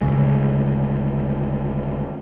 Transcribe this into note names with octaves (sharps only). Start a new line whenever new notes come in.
D#1 D2 C#3 G#3